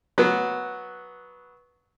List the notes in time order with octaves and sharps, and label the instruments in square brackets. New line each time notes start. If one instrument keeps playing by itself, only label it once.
[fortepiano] F#3 B3